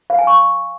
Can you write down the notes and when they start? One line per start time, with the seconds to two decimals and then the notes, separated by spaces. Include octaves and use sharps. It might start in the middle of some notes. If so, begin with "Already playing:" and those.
0.10 F5
0.19 G#5
0.27 C#6